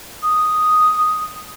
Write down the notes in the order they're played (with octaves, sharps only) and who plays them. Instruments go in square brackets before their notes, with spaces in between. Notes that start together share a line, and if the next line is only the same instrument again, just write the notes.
[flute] D#6